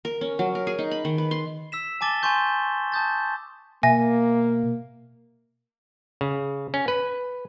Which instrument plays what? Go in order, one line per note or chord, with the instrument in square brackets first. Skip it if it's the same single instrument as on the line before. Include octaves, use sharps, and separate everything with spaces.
[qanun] A#4
C#4
F#3
A#4
G#4
D#4
B5
D#3
B4
C6
[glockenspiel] E6 B6 E7
G#5 A5 D6 A6 G7
G#5 A5 C6 C#6 G6 G7
A5 D#6 G6 A6
[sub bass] B2 [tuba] A#3 [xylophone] E5 G#5 A#6
[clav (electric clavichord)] C#3
C#4
B4